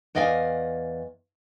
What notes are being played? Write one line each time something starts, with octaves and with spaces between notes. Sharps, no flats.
E2 D5 D#5 F5 G5 G#5